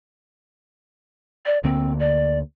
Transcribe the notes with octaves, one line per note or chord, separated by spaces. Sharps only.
D5
D2 D3 A#3 C4
D5